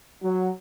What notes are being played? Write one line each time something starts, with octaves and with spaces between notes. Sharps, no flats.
F#3